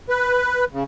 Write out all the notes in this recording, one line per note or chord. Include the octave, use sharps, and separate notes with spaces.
B4
C#3